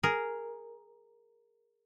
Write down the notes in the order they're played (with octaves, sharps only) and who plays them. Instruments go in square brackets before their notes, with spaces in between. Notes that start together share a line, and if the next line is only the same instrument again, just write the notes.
[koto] G#4 A#4